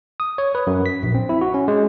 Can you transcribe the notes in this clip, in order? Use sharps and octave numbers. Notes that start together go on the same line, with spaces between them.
D#6
C#5
B4
F#2
B6
A#1
C4
E4
F#4
C#4
G#3